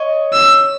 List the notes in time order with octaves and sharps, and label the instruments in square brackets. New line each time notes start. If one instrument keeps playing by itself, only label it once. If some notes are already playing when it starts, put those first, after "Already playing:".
Already playing: [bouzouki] C#5 D#5
[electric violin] E6